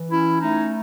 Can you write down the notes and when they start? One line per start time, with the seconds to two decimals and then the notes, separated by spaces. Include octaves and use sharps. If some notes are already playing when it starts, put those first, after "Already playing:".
Already playing: E3
0.10 C#4 E4
0.40 A3 D#4